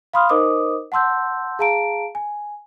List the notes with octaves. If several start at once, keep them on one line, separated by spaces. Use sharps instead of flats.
F5 B5 C6 D#6 F6
D#4 A#4 C5 D#5 D6 D#6
F#5 A5 C6 E6 G6
G#4 F5 A5 A#5 D7
G#5